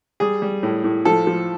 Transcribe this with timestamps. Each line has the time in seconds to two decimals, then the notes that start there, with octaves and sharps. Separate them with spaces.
0.20 G3 G#4
0.42 G3
0.63 A2
0.84 A2
1.05 F3 A4
1.27 F3